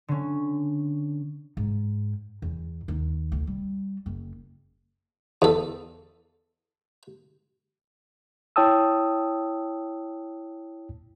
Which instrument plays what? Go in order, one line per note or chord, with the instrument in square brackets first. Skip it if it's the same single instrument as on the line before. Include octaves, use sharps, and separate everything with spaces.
[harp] D3 C#4
[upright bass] G#2
E2
D#2
D2
G3
F#1
[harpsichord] E2 A4
[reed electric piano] E4 C#5 G5 A5 D#6 E6